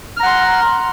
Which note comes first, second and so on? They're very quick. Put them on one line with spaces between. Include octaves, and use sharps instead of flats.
F6 A#5 F#5 C6